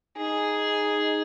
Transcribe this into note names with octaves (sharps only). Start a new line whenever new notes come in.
D#4 G#4